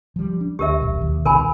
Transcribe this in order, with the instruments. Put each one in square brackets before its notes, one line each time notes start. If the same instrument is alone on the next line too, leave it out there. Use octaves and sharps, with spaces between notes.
[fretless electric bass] F3 G3
D4
[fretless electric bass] D2 [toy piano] G4 A#4 E5
[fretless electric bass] D#1 B1
D#2
[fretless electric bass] C2 B2 D#3 [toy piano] A#4 G#5 B5